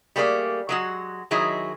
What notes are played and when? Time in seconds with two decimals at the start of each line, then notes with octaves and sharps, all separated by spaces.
0.16 G3 A3 A#3 G#4 D5
0.69 F#3 G#3 F#4
1.31 D#3 F#3 G#3 E4 G#4